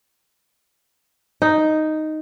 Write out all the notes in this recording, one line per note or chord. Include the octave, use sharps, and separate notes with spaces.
D#4